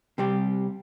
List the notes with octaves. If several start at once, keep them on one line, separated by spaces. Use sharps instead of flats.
C3 G3 C4 G4